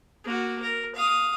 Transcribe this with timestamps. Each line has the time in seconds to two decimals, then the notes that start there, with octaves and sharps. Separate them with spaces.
0.24 A#3 F#4
0.62 A#4
0.95 F5 D#6